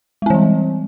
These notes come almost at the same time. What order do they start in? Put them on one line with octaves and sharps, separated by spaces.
G#3 C4 E3 G3